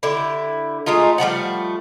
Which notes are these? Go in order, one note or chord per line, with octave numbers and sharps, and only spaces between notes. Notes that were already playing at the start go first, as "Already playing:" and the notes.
D3 E4 G4
G#3 A3 D#4 F4
F3 G3 A3 F#5